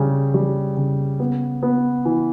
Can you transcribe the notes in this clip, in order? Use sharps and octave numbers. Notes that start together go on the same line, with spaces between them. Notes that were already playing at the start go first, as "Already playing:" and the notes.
Already playing: C#3 G3
G3
C#3
B3
B3
E3